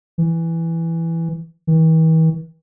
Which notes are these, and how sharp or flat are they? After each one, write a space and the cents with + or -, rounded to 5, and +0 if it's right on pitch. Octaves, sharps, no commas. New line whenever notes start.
E3 +5
E3 -45